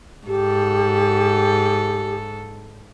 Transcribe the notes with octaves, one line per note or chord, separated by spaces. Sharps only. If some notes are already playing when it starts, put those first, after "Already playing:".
G#2 G4 A4